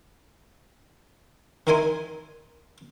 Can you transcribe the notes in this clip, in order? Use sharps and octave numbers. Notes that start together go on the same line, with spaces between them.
D#3 D#4 E4 A#4 G#5 C6